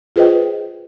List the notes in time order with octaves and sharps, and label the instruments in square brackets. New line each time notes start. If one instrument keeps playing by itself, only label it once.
[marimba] F4 G#4 B4 C5 D#5 G5